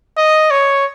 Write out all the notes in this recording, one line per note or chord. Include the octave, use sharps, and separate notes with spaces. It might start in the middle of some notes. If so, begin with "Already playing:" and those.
D#5
C#5